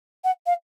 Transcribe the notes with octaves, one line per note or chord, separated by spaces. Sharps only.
F#5
F5